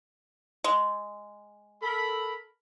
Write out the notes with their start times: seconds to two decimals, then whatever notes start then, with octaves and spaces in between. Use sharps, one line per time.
0.64 G#3
1.82 A4 A#4 B5